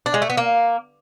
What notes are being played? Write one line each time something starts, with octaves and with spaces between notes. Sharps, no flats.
D4
G#3
A3
B3
A#3